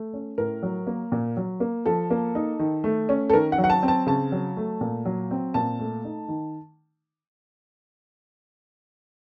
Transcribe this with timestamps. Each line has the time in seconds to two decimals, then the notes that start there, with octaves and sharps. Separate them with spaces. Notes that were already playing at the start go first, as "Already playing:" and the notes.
Already playing: A3
0.13 C#4
0.38 A2 A#4
0.63 F#3
0.87 A#3
1.12 A#2
1.37 F#3
1.60 A#3
1.86 F3 A4
2.10 A#3
2.35 D#4
2.59 D#3
2.84 A3
3.09 C#4
3.30 A4
3.33 D#3 A#4
3.52 F#5
3.58 F#3
3.64 F#5
3.70 A5
3.83 C4
3.88 A5
4.07 C#3 A5
4.32 F#3
4.57 A3
4.81 A#2
5.05 F#3
5.31 C4
5.54 A#2 A5
5.79 A3
6.05 D#4
6.28 D#3